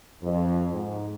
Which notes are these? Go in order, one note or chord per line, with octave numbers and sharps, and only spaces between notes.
F2
G#2